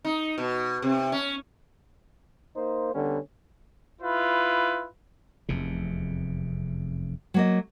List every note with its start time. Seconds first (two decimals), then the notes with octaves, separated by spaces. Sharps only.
0.05 D#4
0.38 B2
0.82 C3
1.12 C#4
2.55 A#3 D#4 C5
2.93 D3 G3 B3 C#4
4.02 E4 F4 B4
5.49 F1 E2 C3
7.34 F#3 A#3 D#5